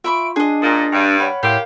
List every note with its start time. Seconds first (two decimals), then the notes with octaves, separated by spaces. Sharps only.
0.04 F4 E5 B5 C#6 D7
0.36 D4 G#4 D#5
0.62 A#2 D#6 A6 A#6
0.93 G2 G5 D7
1.20 C#5 F5 F#5 B5
1.43 A2 G4 A#4 E5 F5 C6